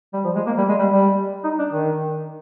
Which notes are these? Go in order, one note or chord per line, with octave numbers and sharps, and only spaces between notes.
G3
F3
G#3
A#3
G3
G#3
G3
G3
D#4
D4
D#3